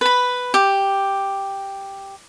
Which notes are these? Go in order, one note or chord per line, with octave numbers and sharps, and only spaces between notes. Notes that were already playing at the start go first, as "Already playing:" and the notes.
B4 B5
G4